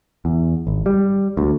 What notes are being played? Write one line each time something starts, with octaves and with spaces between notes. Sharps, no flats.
E2
G#1
G3
D2